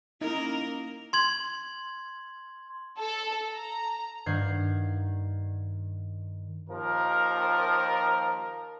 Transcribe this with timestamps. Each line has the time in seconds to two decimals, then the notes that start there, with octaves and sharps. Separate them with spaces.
0.21 A#3 C#4 D#4 E4 A#4
1.13 C6 G#6 F#7
2.98 A4
3.53 A#5
4.26 G2 D#3 F#5 G6 G#6 C7
6.69 D#2 F3 A#4